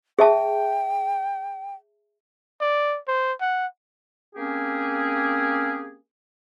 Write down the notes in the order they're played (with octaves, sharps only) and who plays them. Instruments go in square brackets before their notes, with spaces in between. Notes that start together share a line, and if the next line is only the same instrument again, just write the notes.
[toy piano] G#4 E5 A5 [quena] G5
[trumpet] D5
C5
F#5
[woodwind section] A#3 C4 C#4 G4 G#4